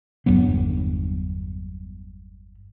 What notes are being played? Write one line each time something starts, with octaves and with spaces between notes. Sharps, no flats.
G1 E2 F#3 B3